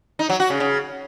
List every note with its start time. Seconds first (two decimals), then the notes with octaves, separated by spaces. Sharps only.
0.19 D#4
0.29 F#3
0.40 F#4
0.50 C#3
0.60 C#3